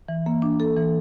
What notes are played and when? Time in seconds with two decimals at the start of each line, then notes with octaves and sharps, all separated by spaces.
0.08 E3
0.26 A#3
0.42 D4
0.60 A4
0.76 E3